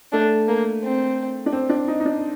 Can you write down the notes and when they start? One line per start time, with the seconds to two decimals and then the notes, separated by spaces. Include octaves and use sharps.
0.12 A3 D4
0.48 A#3
0.83 C4
1.46 D4
1.53 C4
1.69 D4
1.88 D#4
2.00 D#4
2.05 D4